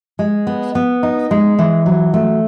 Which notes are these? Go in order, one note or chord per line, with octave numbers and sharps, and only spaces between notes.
G#3
B3
B3
D#4
G#3
E3
F#3
A3